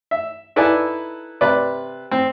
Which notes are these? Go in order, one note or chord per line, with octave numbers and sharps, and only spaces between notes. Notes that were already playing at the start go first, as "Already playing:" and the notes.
E5
D#4 E4 A4 B4 D5 G#5
C3 B4 D5
C4